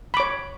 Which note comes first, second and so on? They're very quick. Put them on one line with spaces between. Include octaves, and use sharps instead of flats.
B5 D6 C#5